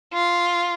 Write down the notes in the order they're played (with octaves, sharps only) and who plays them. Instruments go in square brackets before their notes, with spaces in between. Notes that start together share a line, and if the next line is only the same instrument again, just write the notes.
[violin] F4